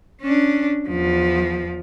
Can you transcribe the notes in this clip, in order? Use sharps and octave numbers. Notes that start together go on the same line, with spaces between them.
C#4 D4
E2 F3